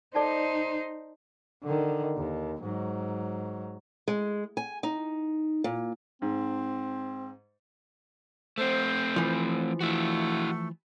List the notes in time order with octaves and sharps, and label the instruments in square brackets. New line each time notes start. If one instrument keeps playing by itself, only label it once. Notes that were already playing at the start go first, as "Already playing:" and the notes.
[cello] D#4 C5 [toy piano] A4 D5 A5
[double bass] D3 D#3
D#2
G#2 F#3
[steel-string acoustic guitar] G#3
G#5
D#4
A#2
[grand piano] G#2 [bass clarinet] C4
[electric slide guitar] A3 C4 [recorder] C5
[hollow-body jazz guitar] E3 F3
[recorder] A3 [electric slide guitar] E4 F#4